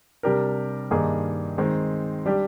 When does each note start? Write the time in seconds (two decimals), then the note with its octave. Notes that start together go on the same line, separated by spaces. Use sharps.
0.23 C3 G3 D4 G4 A#4
0.91 G2 D#3 A#3 D#4 G#4
1.58 D#3 G#3 C4
2.26 G3 D4 G4